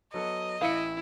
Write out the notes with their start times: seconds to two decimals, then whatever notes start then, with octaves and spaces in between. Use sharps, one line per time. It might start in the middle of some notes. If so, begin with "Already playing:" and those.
0.14 F#3 B3 A4 D#5
0.61 A1 E4 B4 F5 C#7